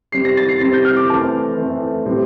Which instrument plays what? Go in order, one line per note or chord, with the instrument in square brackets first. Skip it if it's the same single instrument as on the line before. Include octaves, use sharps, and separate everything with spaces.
[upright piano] C3 G3 C4 C7
A#6
A6
C7
C3 G3 C4 A#6
G6
F6
D6
E3 A3 C4 A5
E3 A3 C4
A2 G3 C4